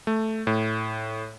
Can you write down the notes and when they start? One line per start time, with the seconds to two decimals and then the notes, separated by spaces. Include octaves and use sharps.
0.07 A3
0.47 A2